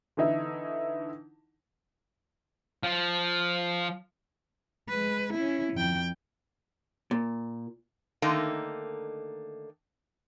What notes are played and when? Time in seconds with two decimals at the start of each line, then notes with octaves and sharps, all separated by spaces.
0.17 D3 E3 D#4 E4
2.83 F3
4.89 G#3 B4
5.33 C#4 E4
5.73 F2 G5
7.11 A#2
8.22 D3 D#3 A3 A#3 D#4